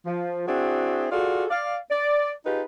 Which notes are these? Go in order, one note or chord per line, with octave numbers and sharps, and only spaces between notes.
F3
C4 D4 E4 F#4 G#4
F4 F#4 G#4 A4 D5
D5 F5
D5
D#4 F4 G4 G#4 B4